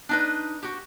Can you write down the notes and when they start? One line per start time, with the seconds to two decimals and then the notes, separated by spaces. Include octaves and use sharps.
0.09 D4 D#4 B4
0.63 F#4 G4